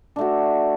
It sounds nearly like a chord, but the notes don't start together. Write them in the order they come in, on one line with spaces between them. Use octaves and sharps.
D4 A3 F#4